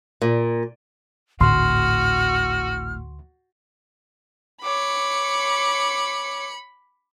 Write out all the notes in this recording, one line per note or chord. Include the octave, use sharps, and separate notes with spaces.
A#2
G#1 D2 A2 F#4 C6 F6
C#5 B5 D6 C#7